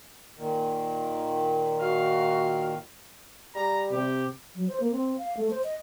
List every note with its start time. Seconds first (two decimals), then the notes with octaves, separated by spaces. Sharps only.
0.37 A#2 D#3
1.80 F#4 F5
3.55 G3 A#5
3.91 C3 G4
4.55 F#3
4.68 C5
4.80 A#3
4.92 C4
5.18 F5
5.37 A3
5.50 C5
5.64 D#5